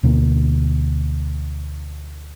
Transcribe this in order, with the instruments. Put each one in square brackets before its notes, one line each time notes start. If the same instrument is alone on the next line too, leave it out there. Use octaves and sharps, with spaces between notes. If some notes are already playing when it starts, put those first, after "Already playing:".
[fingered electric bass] D2 B2 D3 A#3